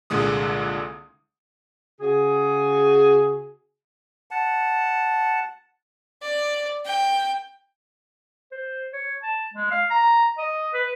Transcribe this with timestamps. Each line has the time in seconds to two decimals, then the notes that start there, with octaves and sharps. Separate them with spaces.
0.10 C2 A#2 D3 G#3 D#6
2.01 C#3 F#4 G#4
4.31 F#5 A5
6.22 D5
6.85 G5
8.52 C5
8.93 C#5
9.23 A5
9.54 G#3
9.71 F5
9.91 A#5
10.38 D#5
10.74 B4